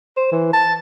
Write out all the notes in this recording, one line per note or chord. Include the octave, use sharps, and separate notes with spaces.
C5
E3
A5